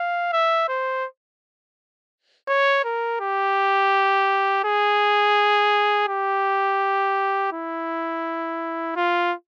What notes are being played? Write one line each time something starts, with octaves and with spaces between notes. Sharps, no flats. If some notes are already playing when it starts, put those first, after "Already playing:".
Already playing: F5
E5
C5
C#5
A#4
G4
G#4
G4
E4
F4